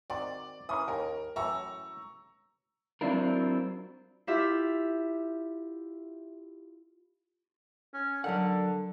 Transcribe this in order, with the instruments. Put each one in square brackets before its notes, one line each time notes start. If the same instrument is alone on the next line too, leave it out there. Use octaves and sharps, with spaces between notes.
[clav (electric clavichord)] D#3 C4 F#4 [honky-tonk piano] D5
[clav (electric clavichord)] E3 C#4 A#4 [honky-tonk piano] D#6
[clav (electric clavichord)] D#2 [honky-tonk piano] A#4
[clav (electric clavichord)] F#2 A2 E3 [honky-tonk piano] A#5 C#6 E6
[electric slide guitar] F#3 C4 D4 E4 F4 A#4
[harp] E4 F4 G4 E5
[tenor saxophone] C#4
[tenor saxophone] D3 [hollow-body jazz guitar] F#3 A#4 F#5